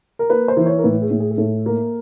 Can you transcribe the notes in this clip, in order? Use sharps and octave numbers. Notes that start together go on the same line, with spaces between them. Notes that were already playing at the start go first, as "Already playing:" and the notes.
A#4
A#3 B4
C5
E3
C#5
A#4
A2 B4
G#4
A2
G#4
G#4
A2 A4
A#3